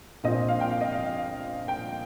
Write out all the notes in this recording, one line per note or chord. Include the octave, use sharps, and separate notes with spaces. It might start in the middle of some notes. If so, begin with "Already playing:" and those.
A#1 A#2 F3 C4 D#5
F5
G5
F5
D#5
F5
G5